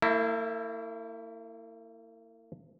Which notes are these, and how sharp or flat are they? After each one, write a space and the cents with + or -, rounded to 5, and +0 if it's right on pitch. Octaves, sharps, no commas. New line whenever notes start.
A#3 -45 E4 +0